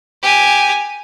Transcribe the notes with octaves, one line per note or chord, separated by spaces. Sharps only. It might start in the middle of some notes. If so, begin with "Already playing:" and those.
G4 G#5